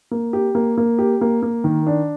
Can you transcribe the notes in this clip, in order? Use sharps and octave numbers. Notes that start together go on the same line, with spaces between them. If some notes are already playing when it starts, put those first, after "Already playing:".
A#3
G4
A#3
A#3
G4
A#3
A#3
D#3
D4